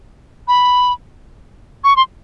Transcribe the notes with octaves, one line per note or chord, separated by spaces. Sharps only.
B5
C#6
C6